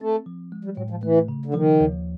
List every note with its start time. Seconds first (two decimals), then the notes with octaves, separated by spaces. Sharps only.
0.01 A3 C4
0.26 F3
0.52 G#3
0.65 G3
0.77 A2 F#3
0.90 F3
1.03 E3 A3
1.28 C#3
1.45 D3
1.54 D#3 F3
1.80 D#2